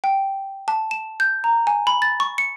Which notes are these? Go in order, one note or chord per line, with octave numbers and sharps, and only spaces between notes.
G5
A5
E7
G6
A#5
G#5
B5
A6
C#6
C#7